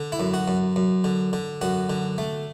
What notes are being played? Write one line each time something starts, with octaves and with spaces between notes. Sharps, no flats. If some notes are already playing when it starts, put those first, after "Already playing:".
Already playing: D3
E4
F#2
F#4
F#2
F#2
D3
D3
F#2 F#4
D3
A3